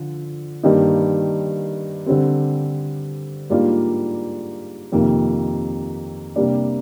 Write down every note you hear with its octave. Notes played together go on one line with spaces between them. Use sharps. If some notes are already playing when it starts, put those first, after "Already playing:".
Already playing: D3 F3
G2 D#3 G3 A#3 D#4
D3 G3 C4
G#2 G3 A#3 D4 F4
F2 C3 D#3 A#3
C3 G3 A#3 D4